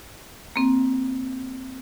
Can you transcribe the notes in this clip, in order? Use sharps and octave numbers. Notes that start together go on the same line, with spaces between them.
A#3 C4